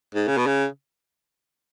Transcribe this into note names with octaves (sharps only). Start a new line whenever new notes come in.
G#2
C#3
B2
C#3